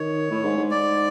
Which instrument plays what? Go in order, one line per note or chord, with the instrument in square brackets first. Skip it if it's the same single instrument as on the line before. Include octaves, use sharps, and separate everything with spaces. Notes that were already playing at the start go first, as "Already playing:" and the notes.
Already playing: [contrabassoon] D#3 [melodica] C#5
[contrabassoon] A2
G#2
G#2
[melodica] D5